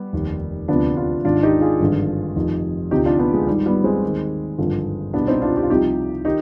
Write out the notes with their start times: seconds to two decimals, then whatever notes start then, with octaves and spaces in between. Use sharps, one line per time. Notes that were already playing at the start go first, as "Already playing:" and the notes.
Already playing: G3 B3
0.13 F1 D#2 D#3
0.68 D2 C3 F3 B3 D4
0.97 D4 F4
1.24 G#1 G#2 D#3 D4 F4
1.43 D#4 G4
1.61 F4 G#4
1.80 G#1 G2 D3 F3
2.36 F1 F2 D#3
2.91 D2 C3 F3 D#4 G4
3.05 D4 F4
3.19 B3 D4
3.34 G#3
3.47 G#1 G#2 D#3 G3
3.66 G3 B3
3.84 G#3 C4
4.03 D#2 D#3
4.58 G#1 G2 D3 F3
5.13 C2 B2 B3 D4
5.28 C4 D#4
5.42 D4 F4
5.56 G4
5.63 F4
5.70 C2 C3 F3 D#4 G4
6.25 D#3 D#4 G4